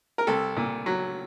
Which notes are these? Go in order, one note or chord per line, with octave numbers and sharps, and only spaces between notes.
A#4
C2 A4
A#2
F#3